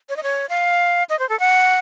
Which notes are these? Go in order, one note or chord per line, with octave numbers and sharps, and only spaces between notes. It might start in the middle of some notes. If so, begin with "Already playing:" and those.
C#5
D#5
C#5
F5
D#5
C5
A4
F#5